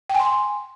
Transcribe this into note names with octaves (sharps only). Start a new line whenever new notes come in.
G5
G#5
C6